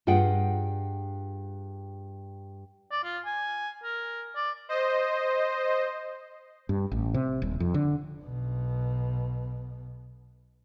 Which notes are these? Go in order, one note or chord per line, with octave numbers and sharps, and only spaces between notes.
G2 F4 G#4 F#5 G5
D5
F4
G#5
A#4
D5
C5 D#5
G2
A1
C3
D#1
F2
D3
B1 B2